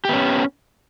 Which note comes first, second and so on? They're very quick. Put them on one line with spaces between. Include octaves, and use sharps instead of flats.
G4 B3 C#4